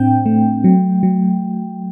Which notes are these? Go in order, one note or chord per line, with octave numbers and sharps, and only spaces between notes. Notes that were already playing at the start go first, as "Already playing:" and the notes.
Already playing: A2 C4 D4 G5
A3
F#3
F#3